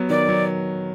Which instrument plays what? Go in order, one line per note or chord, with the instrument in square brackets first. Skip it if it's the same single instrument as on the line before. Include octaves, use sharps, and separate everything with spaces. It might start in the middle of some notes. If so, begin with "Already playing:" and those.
Already playing: [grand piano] F#3 B3
[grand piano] D#3 [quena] D5
[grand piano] F#3 B3